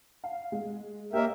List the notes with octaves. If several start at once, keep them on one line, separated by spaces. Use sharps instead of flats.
F5
G#3
A#3 G4 A#4 C#5 D#5 E5